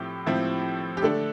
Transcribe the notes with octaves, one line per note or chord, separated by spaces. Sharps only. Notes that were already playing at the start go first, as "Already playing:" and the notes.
Already playing: A2 F3 C4 E4 G4
A2 F3 C4 E4
G4
D3 A3 D4 A4